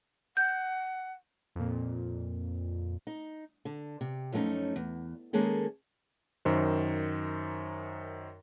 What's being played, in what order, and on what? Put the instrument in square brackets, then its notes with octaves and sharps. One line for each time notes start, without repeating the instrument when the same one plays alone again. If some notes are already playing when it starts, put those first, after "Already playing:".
[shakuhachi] F#5 [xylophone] G6
[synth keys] F2 A#2
[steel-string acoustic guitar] D#4
D3
C3
F#2 F3 A3 A#3 C#4 D#4
E2
D#3 G#3 A#3 C#4 G#4 A4
[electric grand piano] F#2 D#3 C5